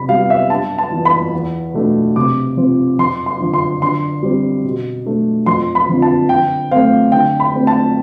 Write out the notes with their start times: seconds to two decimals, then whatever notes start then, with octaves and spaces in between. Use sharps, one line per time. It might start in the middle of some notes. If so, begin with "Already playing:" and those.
Already playing: C3 B5
0.09 G3 B3 F5
0.30 E5
0.50 G2 A5
0.78 A5
0.92 E3 B3
1.05 B5
1.33 E2
1.74 B2 A3 D4
2.16 C3 D6
2.57 F3 C4
2.98 F2 C6
3.26 C6
3.40 D3 F3
3.54 C6
3.81 D3 C6
4.23 G3 C4
4.64 B2
5.06 A3 D4
5.46 F2 C6
5.75 B5
5.88 D3 F3 C4
6.02 A5
6.29 D3 G5
6.71 A3 C4 F5
7.12 D3 G5
7.40 B5
7.53 A3 C4
7.67 A5